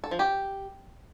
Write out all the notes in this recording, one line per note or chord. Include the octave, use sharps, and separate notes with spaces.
A4
F3
G4